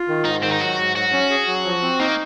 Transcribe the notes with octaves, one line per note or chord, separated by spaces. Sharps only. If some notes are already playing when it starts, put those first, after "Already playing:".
Already playing: F4
D#3
G#2 D#4
D#3 C4
D#4
F#3 F#4
G#2
F#3 F#4
C#4
G#4
F#3
F3
C4
A#3 D#4